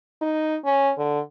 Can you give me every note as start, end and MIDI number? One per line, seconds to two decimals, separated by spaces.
0.21 0.57 63
0.65 0.92 61
0.98 1.19 50